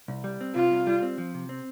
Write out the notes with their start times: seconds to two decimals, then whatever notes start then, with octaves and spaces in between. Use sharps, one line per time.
0.08 C2
0.24 G3
0.41 C4
0.56 C3 F4
0.71 C2
0.87 G3
1.03 C4
1.18 F3
1.34 C3
1.49 C4